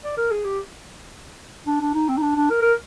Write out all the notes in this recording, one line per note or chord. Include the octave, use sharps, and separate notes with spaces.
D5
A#4
G#4
G4
D4
D4
D#4
C4
D#4
D4
D4
A#4
A#4